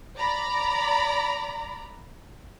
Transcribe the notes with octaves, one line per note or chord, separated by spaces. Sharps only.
D5 A#5 B5